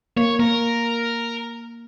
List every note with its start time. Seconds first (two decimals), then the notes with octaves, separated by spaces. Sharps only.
0.17 A#3 C#5
0.39 A#3 A#4